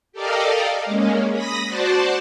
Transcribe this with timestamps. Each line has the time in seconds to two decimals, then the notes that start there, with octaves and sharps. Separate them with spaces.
0.12 G4 A4 A#4 D5 D#5 F5
0.85 G#3 A#3 C#4
1.32 B5 D#6 A#6
1.65 F#4 C5 D5 A5